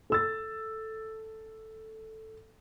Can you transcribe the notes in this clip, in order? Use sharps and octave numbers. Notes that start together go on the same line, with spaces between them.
A4 E6 A6